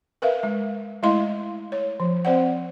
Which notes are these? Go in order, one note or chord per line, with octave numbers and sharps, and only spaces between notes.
A#4 B4 E5 F5
G#3
G#3 A3 E4 D#5 F5 C6
C#5
F3
C4 C5 D5 F#5